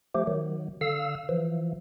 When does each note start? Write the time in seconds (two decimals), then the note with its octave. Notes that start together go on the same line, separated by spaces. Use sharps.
0.15 F3 A3 G4
0.27 D#3 F#3
0.81 D3 F5 E6
1.29 E3 F3